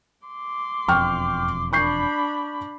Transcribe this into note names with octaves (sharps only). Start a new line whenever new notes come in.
C6 D6
E1 F2 G5 C#6 F6
D4 B5 C#6 G6 C7